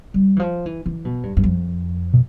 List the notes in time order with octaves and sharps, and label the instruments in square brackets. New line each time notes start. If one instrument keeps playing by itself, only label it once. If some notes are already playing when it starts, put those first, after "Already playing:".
[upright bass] G3
E3
F3
E3
E3
B2
G2
G2
F2
[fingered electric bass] B2